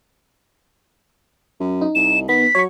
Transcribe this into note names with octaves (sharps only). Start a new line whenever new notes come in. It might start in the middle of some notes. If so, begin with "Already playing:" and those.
F#2
D#4
C2 E7
D#3 B3 B6
F#3 C#5 C#6